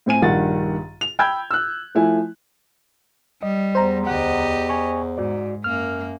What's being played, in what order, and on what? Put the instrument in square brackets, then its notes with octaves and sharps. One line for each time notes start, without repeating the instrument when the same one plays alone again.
[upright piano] A2 C4 G#5 D#7
A#1 G2 D#3 F#5 A6
F7
G5 B5 E6 G6 G#6
E6 F#6
F3 A3 E4 G#5
[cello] G3 [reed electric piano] D#5
[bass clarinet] E2 [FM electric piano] C5 A#5
[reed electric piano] D2 F#5 [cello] G4 D#5
[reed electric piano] G#5 C#6
[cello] G#2 [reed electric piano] F#4 D5
[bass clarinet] F#2 [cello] A#3 [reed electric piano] F6